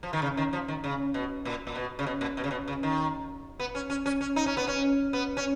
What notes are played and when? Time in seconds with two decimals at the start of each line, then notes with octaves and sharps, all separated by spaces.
0.03 F3
0.13 D#3
0.22 C#3
0.37 D#3
0.53 F3
0.68 D#3
0.84 C#3
1.14 B2
1.45 A#2
1.67 A#2
1.76 B2
1.99 C#3
2.06 B2
2.21 A#2
2.37 B2
2.44 C#3
2.51 B2
2.68 C#3
2.83 D#3
3.60 B3
3.75 C#4
3.90 C#4
4.06 C#4
4.21 C#4
4.36 D#4
4.46 C#4
4.57 B3
4.67 C#4
5.13 B3
5.37 C#4